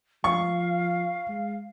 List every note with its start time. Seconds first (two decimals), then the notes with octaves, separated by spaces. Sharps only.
0.24 F3 F5 C#6
1.29 G#3